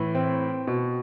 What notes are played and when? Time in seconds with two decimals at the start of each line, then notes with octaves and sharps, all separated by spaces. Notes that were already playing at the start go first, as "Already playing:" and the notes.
Already playing: A2 E3
0.15 C4
0.67 B2